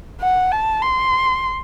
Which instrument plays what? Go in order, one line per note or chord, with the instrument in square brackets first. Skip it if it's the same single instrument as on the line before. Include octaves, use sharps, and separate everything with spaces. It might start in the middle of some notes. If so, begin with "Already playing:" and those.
[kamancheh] F#5
A5
C6